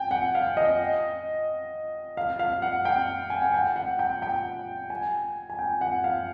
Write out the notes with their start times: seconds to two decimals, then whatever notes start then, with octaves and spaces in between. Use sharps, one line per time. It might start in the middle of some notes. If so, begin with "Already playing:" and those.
Already playing: G5 G#5
0.11 F#5
0.35 F5
0.57 D#5
2.17 F5
2.39 F5
2.62 F#5
2.85 G5
3.30 G#5
3.42 F#5
3.54 G5
3.76 F#5
3.99 G5
4.22 G5
4.90 G#5
5.50 G#5
5.59 G5
5.81 F#5
6.04 F5